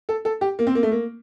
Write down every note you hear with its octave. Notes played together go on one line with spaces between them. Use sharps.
A4
A4
G4
A#3
C4
A#3
A3
A#3